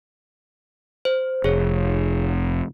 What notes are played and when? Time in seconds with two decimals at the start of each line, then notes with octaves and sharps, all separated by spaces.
1.05 C5
1.44 F1 G#4 C#5